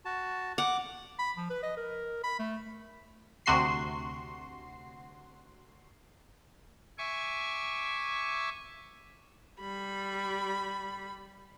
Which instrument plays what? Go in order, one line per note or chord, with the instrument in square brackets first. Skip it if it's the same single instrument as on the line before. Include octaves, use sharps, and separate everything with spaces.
[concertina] F#4 A5
[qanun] F#5 [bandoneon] D6
[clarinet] B5
F3
B4
D#5
A#4
B5
A3
[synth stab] D2 C3 F#4 C6 C7
[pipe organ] E5 G#5 C#6 D6
[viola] G3 B5